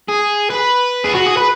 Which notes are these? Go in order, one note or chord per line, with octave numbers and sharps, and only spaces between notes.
G#4
B4
G#4
F#4
G#4
B4